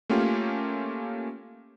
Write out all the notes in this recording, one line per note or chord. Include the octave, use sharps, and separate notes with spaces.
A3 A#3 C#4 F4 G4